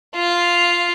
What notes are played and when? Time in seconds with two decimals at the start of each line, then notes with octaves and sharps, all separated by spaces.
0.15 F4 F5